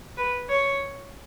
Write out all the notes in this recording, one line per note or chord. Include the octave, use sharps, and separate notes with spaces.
B4
C#5